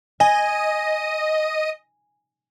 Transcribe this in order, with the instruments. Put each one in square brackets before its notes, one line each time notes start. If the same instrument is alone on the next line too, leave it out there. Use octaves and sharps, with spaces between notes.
[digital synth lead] D#5 [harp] G#5